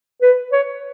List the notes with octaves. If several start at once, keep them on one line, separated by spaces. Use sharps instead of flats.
B4
C#5